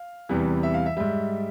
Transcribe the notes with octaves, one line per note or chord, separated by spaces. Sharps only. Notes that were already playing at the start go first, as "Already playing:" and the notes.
Already playing: F5
E2 C3 E3 G3
E5
F5
E5
G#2 G3 E5